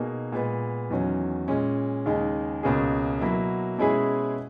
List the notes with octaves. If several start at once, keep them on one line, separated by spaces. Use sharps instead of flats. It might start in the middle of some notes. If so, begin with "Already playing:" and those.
Already playing: B2 A#3 D#4 G#4
A#2 G#3 B3
E2 D#3 F#3 C#4
A#2 G#3 C#4
D#2 C#3 G#3 D#4
C#2 B2 A#3 C#4 G#4
B2 F#3 A#3 E4
B2 G#3 C#4 E4 G#4